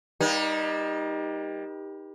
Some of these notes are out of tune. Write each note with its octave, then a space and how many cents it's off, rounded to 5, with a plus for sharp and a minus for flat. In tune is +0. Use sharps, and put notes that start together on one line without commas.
G3 +15 A#3 +35 D#4 +0